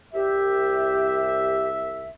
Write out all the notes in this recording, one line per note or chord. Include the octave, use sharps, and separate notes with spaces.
C2 G4 E5